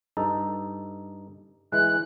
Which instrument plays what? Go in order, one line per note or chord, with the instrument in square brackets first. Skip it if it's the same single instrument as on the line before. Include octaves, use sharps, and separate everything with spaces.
[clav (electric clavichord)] G2 D#4 A4
[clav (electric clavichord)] E3 G#3 [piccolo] F#6